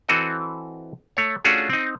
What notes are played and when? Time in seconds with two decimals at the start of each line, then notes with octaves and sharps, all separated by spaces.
0.09 E3 C4 F#4 A4 D#5
1.17 A3 C#5
1.44 A3 C#4 D4 F4 F#4 G#4
1.70 C4 D#4